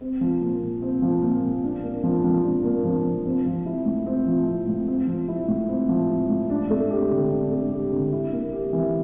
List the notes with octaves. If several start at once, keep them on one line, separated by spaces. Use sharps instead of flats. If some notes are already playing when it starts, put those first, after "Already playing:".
C4
F3
A#2
A#2
C4
F3
A#2
A#2
D4
A#3
F3
F3
D4
A#3
F3
F3
C4
F3
E4
A2
C4
F3
E4
A2
C4
F3
E4
A2
C4
F3
E4
A2
D4
A3
G4
D3
D4
A3
G4
D3
E4
A#3
G4
E3